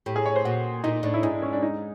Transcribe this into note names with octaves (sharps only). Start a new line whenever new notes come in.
A2 G4
G#4
C#5
C5
A#2 F#4
A#2 D#4
A2 D4
E4
G#2 D#4
D4
C#4
D4
D#4